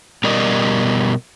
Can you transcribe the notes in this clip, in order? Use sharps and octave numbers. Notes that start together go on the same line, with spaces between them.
B2 G3 A#4 D5 D#5